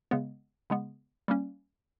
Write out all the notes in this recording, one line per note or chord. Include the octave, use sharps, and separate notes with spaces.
C#3 G#3 B3
C#3 G#3 B3
G3 A#3 C#4